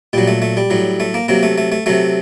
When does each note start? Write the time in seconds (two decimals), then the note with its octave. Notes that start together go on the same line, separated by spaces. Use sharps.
0.13 A#2 F#3 G3
0.28 A3
0.42 A3
0.57 G3
0.70 A2 F#3
1.00 A3
1.14 A#3
1.28 C3 F#3 A#3
1.43 A3
1.58 A3
1.72 A3
1.86 C3 F#3 A3